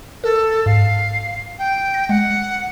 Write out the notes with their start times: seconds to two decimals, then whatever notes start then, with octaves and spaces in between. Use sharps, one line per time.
0.24 A4 A#4
0.66 G#2 F5
1.59 G5
1.94 A#6
2.09 G#3 F#5